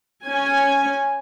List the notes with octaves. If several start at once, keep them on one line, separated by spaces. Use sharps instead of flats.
C#4 G#5